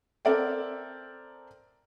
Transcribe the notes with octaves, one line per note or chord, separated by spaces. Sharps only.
C4 A4 A#4 D5 E5 G5